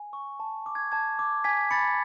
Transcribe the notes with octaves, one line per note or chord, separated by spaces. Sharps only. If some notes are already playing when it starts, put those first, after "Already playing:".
Already playing: G#5
C#6
A5
D6
G#6
A5 G#6
D6
G#5 G#6 B6
B5 A6 C#7